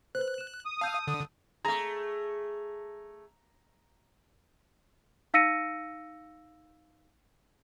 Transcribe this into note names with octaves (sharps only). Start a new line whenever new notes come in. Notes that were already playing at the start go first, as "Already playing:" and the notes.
B4 C5 F#6
E7
D#6
F5 A5 E6 G6
D3
A3 G#4 A#5
D#4 F5 E6 A#6 C#7 D#7